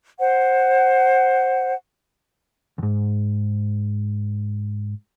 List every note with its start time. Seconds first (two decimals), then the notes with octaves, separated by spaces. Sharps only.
0.20 C5 F#5
2.78 D2 G#2